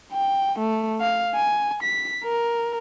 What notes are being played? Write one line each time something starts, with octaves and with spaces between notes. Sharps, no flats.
G5
A3
F5
G#5
B6
A#4